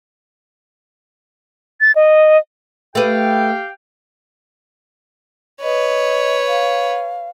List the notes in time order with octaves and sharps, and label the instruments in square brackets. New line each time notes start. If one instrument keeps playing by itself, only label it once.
[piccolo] A6
D#5
[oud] A3 B4 [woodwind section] G4 F5 G5
[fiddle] B4 C#5 [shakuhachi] D#5
[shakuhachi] F5